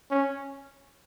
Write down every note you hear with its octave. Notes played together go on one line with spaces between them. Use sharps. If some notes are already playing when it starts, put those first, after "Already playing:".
C#4